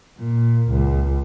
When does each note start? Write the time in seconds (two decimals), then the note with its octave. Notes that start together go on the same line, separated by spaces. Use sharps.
0.18 A#2
0.70 C#2